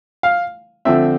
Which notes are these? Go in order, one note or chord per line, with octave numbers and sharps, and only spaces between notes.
F5
D3 F3 A3 C4 E5